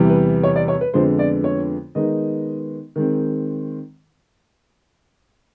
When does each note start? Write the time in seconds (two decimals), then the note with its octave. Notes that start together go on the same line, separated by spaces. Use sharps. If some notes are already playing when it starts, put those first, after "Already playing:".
Already playing: E2 C3 E3 G3
0.09 B4
0.43 C#5
0.56 D5
0.68 C#5
0.81 B4
0.94 F2 D3 F3 G#3 B3 C5
1.19 D5
1.44 C#5
1.95 D#3 G#3 B3 D#4 D#5
2.96 D#3 G#3 C4